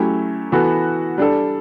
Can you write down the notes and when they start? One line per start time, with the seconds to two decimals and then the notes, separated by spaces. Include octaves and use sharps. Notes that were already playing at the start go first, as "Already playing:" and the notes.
Already playing: F#3 A3 C#4 E4 G4
0.52 E3 B3 F#4 A4
1.18 G3 D4 A4